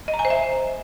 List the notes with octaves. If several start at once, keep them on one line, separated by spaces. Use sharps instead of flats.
D#5
A#5
G#5
C5
E5